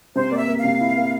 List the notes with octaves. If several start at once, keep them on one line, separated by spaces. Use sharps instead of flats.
C3 C5
A#3 D5
E5
A#3
F5
C3
E4
A#3